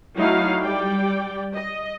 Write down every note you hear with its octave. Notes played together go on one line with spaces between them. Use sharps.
F#3 A3 D#4 E4 F5
G3 D5 G5
D#5